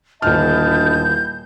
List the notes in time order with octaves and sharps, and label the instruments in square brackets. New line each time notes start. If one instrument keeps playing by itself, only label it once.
[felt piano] D#1 F6 [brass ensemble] D2 D#5 [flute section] E4 G6 [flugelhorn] A5